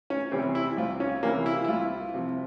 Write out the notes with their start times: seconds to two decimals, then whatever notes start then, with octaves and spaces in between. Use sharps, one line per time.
0.10 C#4
0.32 C3 E3 G3 C4
0.55 E4
0.78 C2 F4
1.00 C#4
1.23 C3 E3 G3 A#3
1.46 E4
1.64 E4
1.68 C2 F4
2.14 C3 F3